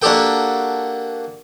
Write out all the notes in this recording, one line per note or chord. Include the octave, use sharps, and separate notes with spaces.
A#3 D4 F#4 G4 A4 G5